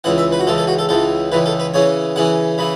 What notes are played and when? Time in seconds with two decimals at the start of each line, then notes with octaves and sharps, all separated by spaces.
0.04 C#2 C#3 E3 F#5
0.18 E5
0.32 B4
0.39 F#4
0.47 C#2 C#3 E3 A4
0.58 A4
0.67 F#4
0.79 A4
0.89 C#2 C#3 E3 A4
1.32 C#2 C#3 E3 B4
1.46 A4
1.60 B4
1.74 C#3 E3 C#4 C#5
2.16 C#3 E3 C#4 F#5
2.58 C#3 E3 B5